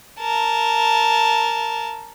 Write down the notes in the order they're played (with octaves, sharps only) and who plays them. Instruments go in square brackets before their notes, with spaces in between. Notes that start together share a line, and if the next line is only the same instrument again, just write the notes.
[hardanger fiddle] A#4 A5